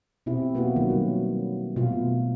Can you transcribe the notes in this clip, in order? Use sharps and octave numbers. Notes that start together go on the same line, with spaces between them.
B2 C4 E4 G4
A#3 B3 F4 F#4
D#3 F#3
G3
B2 A3 F4